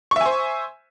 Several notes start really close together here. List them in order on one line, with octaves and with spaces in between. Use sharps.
C#6 E5 G#5 C5